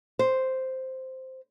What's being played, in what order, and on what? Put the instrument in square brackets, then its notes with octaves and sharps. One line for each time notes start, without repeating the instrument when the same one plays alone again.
[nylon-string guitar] C5